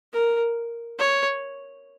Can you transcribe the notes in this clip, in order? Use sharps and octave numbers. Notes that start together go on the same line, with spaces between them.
A#4
C#5